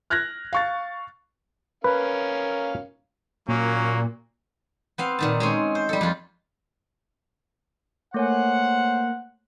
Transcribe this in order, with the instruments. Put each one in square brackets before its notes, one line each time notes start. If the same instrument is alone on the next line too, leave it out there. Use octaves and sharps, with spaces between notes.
[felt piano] F6 F#6 G#6 A#6
F5 C#6 A6
[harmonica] C#4 A#4 F5 [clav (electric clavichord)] B4
[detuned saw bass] A#2 [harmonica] F#3 C#4 [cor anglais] A#3
[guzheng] B3 C4 F5
A#2 D#3 A5
G#3 C4 C#4
C5
G3 A4
F2 F4
[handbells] A3 C#5 G#5 [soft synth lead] A#3 [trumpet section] C5 F#5